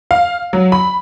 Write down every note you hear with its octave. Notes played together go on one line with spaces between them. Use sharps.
F5
F#3
B5